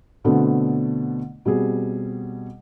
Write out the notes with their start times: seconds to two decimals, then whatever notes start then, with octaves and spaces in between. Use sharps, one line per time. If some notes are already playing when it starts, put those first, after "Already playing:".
0.24 B2 D3 A3 B3 C4 D4
1.45 B2 G3 C4 G#4